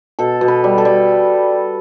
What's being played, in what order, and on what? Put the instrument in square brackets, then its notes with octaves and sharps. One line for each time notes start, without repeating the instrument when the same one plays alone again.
[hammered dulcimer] B2 A4
B2
B4
G3
A4
G3